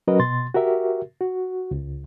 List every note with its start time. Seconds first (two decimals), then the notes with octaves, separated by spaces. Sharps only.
0.08 F#3 C#4 F#4 A#4 B4 D#5
0.19 B2 C6 A6
0.55 F#4 G4 A#4 E5
1.21 F#4
1.71 C#2